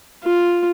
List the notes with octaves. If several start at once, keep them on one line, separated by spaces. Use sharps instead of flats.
F4